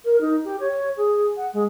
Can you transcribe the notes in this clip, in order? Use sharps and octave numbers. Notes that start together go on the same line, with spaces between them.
A#4
D#4
G4
C#5
G#4
F#5
G#3